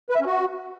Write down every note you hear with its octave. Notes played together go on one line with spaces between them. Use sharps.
B4
E5
C#4
F#4